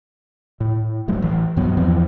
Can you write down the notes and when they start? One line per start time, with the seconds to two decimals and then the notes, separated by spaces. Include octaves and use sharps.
0.60 A2
1.08 D#1 G2 F#3 A3
1.22 A1 E3
1.56 B1 G2 F#3 B3
1.77 E2 E3 F3 C4